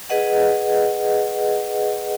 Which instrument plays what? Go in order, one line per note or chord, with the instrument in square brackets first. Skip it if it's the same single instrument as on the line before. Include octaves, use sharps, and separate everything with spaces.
[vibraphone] G#4 B4 D#5 F#5